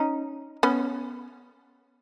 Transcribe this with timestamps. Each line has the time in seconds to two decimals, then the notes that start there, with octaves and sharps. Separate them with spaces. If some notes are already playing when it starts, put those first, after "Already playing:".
Already playing: C#4 D#4
0.63 B3 C#4